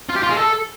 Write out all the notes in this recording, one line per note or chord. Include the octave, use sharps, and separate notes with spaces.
F4
G4
F4
G#3
A4